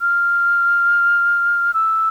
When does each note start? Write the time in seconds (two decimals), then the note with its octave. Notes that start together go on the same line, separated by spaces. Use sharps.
0.01 F6
1.74 E6